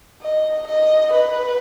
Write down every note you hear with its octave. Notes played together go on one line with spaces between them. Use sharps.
D#5
D#5
B4